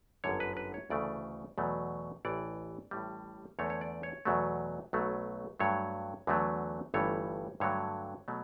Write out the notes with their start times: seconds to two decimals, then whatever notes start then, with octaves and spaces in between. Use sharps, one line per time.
0.24 G1 F#2 D3 C#5
0.40 B4
0.57 B4
0.74 C#5
0.90 D2 C#3 E3 A3 D5
1.58 E2 B2 F#3 A3
2.25 A1 A2 E3 D5
2.91 A1 A2 G3
3.59 E2 D3 A3 C#5
3.70 C#5
3.81 D5
4.03 C#5
4.25 E2 B2 F#3 A3
4.93 B1 B2 F#3 A3
5.59 G2 F#3 A3 C#5
6.27 E2 D3 F#3 A3
6.94 G1 G2 E3 A3 C#5
7.60 G2 D3 F#3 A3 C#5
8.28 B2 F#3 A3